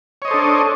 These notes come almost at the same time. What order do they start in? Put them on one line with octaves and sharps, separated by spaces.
C#5 D#5 C5 A4 D4